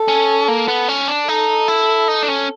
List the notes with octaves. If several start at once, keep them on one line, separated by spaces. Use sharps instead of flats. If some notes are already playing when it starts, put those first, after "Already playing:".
Already playing: A4
C#4
A#3
B3
C#4
D4
D#4 A4
E4
D#4
D4
C#4